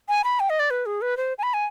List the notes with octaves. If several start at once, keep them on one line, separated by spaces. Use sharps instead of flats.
G#5
B5
G5
D#5
D5
B4
G#4
B4
C5
G#5
B5
G#5